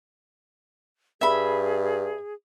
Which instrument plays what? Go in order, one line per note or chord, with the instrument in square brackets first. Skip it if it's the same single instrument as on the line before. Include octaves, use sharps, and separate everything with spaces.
[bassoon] G2 [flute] G#4 [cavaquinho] E5 B5